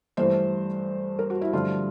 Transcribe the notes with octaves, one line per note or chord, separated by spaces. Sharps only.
G2 E3 A3 C5
A#4
F#4
E4
G2 D3 F3 A3 F4